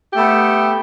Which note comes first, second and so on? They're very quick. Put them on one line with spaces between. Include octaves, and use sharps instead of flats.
G4 A3 B3